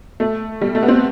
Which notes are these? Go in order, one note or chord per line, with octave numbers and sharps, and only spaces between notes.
A3
G3
A3
B3
C4